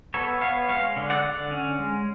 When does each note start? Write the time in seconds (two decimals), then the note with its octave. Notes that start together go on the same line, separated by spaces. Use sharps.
0.14 B3 A4 C#5
0.41 B3 C#5 F5
0.69 G#3 C#5 F5
0.96 D3
1.10 D5 F#5
1.24 D3
1.51 C#4
1.79 G#3